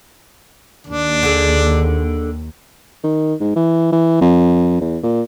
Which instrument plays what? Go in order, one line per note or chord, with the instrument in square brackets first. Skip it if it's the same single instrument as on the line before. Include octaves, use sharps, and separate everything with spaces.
[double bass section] D#2 [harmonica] D4
[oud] D3 G#4
[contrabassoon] D#3
G#2
E3
E3
F2
E2
A#2